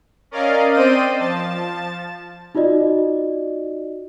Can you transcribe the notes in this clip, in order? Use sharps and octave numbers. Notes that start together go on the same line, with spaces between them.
C#4 A#4 D5 D#5 F5
C4 C5 D5 D#5 G5 D#7
F3 A5 A6
D#4 F4 F#4 D5 D#5